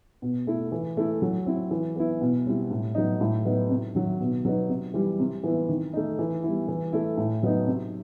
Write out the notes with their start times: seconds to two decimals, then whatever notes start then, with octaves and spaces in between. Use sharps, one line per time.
0.22 B2
0.47 A3 E4
0.72 E3
0.97 A3 E4
1.22 F#3
1.46 C4 E4
1.71 E3
1.96 B3 E4
2.21 B2
2.46 G3 C4 E4
2.71 A2
2.95 F#3 B3 D#4
3.21 A2
3.45 F#3 B3 D#4
3.70 C3
3.95 D#3 F#3
4.20 B2
4.45 F#3 B3 D#4
4.70 C3
4.94 E3 G3
5.20 C3
5.43 E3 B3 E4
5.69 D#3
5.94 A3 D#4
6.19 E3
6.43 G3 B3 E4
6.68 E3
6.93 A3 E4
7.17 A2
7.43 F#3 B3 D#4
7.67 C3